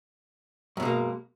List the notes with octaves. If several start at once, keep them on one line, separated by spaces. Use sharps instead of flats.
F#2 B2 G#3 A#3